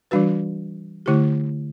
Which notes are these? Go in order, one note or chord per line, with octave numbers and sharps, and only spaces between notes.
E3 G3 D4 F#4 B4
D3 A3 E4 G4